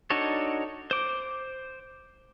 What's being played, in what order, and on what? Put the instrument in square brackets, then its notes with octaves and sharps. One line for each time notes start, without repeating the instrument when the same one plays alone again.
[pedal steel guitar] D4 D#4 F#4 A4 C#5
C5 D6